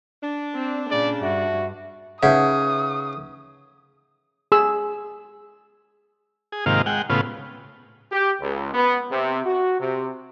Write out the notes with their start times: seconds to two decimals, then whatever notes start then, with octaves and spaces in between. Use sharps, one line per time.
0.23 D4
0.55 C4
0.90 A#2 C#3 D5
1.22 G2 F#4 E5
2.23 C#3 D#4 B4 E5 F#5 D#6 G6
4.52 G#4 E6
6.52 G#4
6.66 G#2 C3 D#3 A#3 F4
6.86 G#3 F#5 G5
7.10 A2 C#3 B3 F4
8.12 G4
8.41 C#2
8.74 B3
9.11 C3
9.46 F#4
9.80 C3